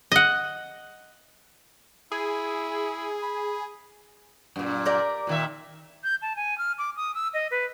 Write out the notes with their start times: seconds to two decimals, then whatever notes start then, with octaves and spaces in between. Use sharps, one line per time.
0.12 D#5 F#5
2.12 E4 G#4
3.22 B5
4.56 F#2 A#2
4.86 G4 A#4 D5
5.27 A#2 D#3 E5
6.04 G6
6.22 A5
6.36 G#5
6.58 F6
6.78 D6
6.97 D#6
7.15 E6
7.34 D#5
7.51 B4